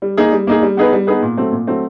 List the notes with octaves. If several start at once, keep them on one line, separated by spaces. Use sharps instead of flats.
G3
A#3 D#4 G#4
G3
A#3 D#4 G#4
G3
B3 D#4 G#4 B4
G3
B3 D#4 G#4 B4
A#2
F#3 A3 C4
A#2
F#3 A3 C4